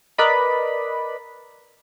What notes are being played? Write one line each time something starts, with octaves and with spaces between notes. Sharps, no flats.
A#4 B4 D5 D#5 B5